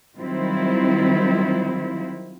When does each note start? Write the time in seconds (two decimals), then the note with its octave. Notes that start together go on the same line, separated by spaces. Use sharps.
0.18 D#3 F#3 G3 C4 E4 F4